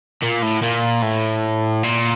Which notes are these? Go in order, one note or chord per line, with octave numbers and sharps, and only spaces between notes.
A#2
A2
A#2
A2
A#2